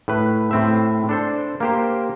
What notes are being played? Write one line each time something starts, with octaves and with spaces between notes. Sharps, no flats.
A2 B4
A2 C4 E5
D4 A4 C5
A#3 G4 C5